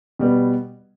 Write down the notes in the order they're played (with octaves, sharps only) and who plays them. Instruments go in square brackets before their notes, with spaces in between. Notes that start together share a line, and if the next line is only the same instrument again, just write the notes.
[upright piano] B2 G3 B3